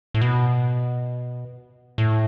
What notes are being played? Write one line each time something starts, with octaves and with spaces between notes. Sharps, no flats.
A2
B2
A2